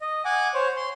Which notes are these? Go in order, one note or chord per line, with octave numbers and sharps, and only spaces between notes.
D#5
F#5 G#5 D6
C5 C#5
C6